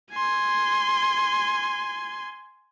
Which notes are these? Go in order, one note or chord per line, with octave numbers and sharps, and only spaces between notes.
G#5 C6